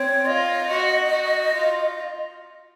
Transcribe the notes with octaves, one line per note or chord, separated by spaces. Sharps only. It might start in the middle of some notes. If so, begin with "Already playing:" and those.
Already playing: C4 C#5
F4 D#5
F#4
F#4
F4